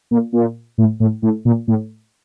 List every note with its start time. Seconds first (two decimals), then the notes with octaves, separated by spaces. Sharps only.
0.11 A#2
0.33 A#2
0.78 A2
1.00 A2
1.22 A2
1.45 A#2
1.68 A2